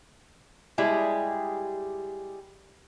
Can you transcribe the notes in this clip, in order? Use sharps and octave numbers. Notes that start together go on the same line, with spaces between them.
G3 G#3 E4 G4 G#4